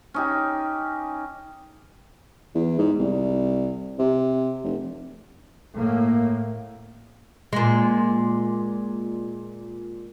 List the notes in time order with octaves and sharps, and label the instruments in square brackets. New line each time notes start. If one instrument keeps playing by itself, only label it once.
[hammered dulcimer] C#4 D#4 G4
[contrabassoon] E2
G#2
C2
C3
F1
[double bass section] A2 A#3
[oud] A#2 G#3